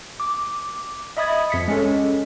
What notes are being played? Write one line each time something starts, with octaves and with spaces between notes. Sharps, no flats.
D6
D#5 E5 B5 D#6 G#6 A6
F2 B6 C#7
G#3 C#4 A4